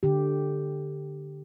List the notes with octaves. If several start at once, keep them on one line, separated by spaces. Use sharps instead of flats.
D3 G4